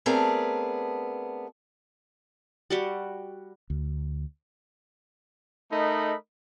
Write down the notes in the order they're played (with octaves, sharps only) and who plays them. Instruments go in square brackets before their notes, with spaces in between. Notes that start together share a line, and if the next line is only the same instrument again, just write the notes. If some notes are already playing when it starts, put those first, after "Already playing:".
[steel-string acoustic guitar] A3 B3 C4 D4 G#4 A#4
[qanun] G3 F#4 G4
[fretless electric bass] D2
[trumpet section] A3 D#4 A#4 D#5 B5